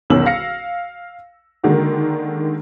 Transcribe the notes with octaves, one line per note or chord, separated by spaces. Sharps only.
B1 E2 D#3 C#4 E6 F#7
F5 A#6 C#7
D3 D#3 G#3 A#3 F#4